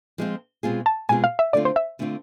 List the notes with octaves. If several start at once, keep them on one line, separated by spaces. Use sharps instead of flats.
F3 G#3 C4 F4
B2 G#3 C4 F4 G#4
A5
B2 G#3 C4 F4 G#4 G#5
F5
E5
D3 A3 C4 F4 D5
C5
E5
D3 A3 C4 F4